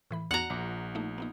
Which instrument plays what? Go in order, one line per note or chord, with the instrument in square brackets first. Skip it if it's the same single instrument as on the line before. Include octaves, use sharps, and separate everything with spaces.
[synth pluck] A2 E3 B5
[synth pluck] E2 B3 F#4 [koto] F#5 A#5
[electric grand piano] A#1 [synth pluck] D6
[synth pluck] A3 A#3 D#4
A#3 B3 D#4